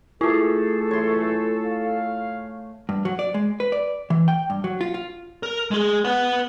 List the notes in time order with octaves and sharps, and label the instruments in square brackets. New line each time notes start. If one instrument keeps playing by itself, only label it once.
[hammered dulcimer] A3 G#4 [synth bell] E4 F4 [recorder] A4
[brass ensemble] F#1 E3 A3 [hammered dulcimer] C#5 C6
[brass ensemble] F5
[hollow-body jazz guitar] G2
F#3
D5
G#3
B4
D5
E3
G5
G2
F#3
F4
F4
[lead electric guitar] A#4
G#3 G#4
B4 F#5